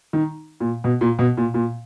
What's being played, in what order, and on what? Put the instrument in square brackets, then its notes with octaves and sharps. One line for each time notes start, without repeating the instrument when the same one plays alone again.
[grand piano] D#3
A#2
B2
A#2
B2
A#2
A#2